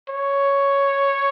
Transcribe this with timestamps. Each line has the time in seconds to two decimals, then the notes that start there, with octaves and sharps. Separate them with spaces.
0.09 C#5